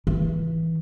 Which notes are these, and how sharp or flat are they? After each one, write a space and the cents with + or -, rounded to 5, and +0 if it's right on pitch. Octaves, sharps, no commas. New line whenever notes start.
E3 -15